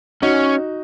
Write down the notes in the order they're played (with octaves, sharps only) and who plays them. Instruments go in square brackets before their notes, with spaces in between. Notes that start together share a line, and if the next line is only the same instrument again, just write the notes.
[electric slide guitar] C#4 [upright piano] D#4 F#4